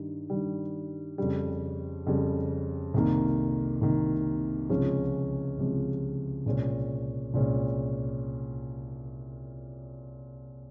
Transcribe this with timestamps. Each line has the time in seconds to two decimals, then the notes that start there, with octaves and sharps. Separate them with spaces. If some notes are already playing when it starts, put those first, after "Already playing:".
Already playing: G2 D#3 G3
0.30 G2 D#3 G3
1.18 F2 C#3 G3
2.07 F2 C#3 G3
2.94 C2 C3 D#3 A#3
3.81 C2 C3 D#3 A#3
4.69 C#2 C3 F3 G#3 C#4
5.58 C#2 C3 F3 G#3 C#4
6.46 C2 A#2 G#3 C#4
7.34 C2 A#2 G#3 C#4